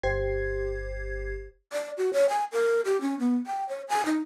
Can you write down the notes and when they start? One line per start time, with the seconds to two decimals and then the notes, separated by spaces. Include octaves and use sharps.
0.03 G1 G4 C5 G#6 C7
1.73 D5
1.98 F#4
2.13 C#5
2.29 G#5
2.52 A#4
2.85 G4
3.01 C#4
3.19 B3
3.47 G5
3.69 C#5
3.89 G#5
4.06 D#4